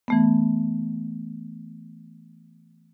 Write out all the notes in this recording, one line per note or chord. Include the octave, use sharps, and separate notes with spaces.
E3 A3 B3